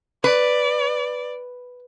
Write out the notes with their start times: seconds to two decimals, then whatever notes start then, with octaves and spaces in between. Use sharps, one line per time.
0.24 B4 D5